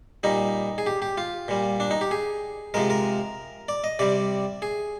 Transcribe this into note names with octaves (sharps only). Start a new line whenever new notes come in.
A#2 G3 D#4
G#4
G4
G4
F4
A#2 G3
D4
D#4
G4
G#4
C3 F3 G#3 A#4
A#4
D5
D#5
C3 G3 D5
G#4